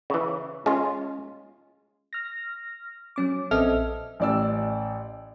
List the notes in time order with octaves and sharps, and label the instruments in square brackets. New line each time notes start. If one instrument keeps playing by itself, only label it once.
[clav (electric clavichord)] C#3 E3
[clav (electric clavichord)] G#3 [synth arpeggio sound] C#4 F4
[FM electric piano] F6 A#6
F#3 C#4 D6
A#1 C4 A4 D#5 E5 F6
[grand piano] A1 D5 E6